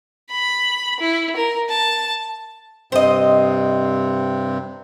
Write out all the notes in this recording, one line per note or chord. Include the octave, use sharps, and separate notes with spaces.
B5
E4
A#4
A5
G2 C3 C4 C5 D#5